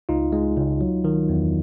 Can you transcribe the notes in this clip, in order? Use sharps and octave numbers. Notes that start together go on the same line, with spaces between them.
C#2 D#4 F4
G#3
C#2
F#3
D#3
E2